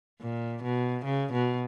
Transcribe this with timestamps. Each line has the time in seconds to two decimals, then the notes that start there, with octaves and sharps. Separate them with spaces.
0.20 A#2
0.63 B2
1.05 C#3
1.32 B2